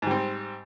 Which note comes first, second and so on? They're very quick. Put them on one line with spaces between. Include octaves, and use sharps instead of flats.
G#2 G3 C4